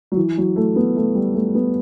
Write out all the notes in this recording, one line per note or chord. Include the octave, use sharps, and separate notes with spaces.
F#3
E3
F#3
A3
B3
A3
G3
A3
B3